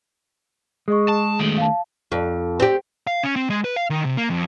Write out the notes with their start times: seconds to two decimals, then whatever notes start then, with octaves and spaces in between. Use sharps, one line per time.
0.88 G#3 G#4 D#5 C#6
1.09 A5
1.40 D#3 A3 D7 F#7 G7
1.58 F5 A5
2.12 F2
2.60 C4 G4
3.07 F5
3.23 C#4
3.36 C4
3.50 G#3
3.64 B4
3.76 F5
3.90 D#3
4.05 C3
4.17 A#3
4.30 F2